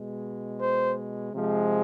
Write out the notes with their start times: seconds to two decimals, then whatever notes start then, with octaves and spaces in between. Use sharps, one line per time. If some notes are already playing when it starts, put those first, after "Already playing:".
Already playing: B2 G#3
0.61 C5
1.34 C3 F3 G#3